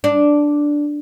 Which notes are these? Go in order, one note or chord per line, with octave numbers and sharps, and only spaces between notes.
D4